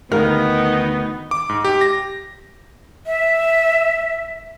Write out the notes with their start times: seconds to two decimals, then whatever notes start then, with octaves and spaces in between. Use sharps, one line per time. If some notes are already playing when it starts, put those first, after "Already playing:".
0.12 D2 D#3 B3 D#4 A#4 F5
1.31 D6
1.49 G#2
1.65 G4
1.81 A#6
3.06 E5